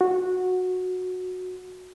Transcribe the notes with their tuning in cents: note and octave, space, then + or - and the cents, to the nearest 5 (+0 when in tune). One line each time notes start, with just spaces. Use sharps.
F#4 -15